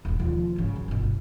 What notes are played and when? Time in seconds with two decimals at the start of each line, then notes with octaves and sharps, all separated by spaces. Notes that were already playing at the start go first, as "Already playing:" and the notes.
0.05 E1 G2
0.19 D#2 F3
0.56 G#2 C#3
0.76 F#2
0.88 G1 B2
1.03 G2